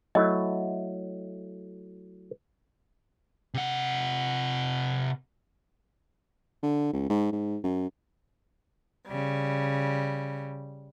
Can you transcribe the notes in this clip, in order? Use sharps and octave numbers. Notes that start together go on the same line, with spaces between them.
F#3 A3 E4 D#5
C3 F#5
D3
C#2
G#2
G#2
F#2
C#3 G3